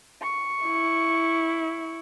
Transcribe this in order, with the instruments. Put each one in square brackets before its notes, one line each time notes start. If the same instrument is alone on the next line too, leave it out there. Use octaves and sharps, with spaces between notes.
[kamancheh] C#6
[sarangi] E4